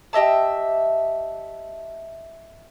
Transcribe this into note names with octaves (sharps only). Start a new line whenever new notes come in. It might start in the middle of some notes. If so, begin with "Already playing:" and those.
G4 D#5 E5 A5